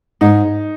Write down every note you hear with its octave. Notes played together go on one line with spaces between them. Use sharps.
G#2 G#3 D#4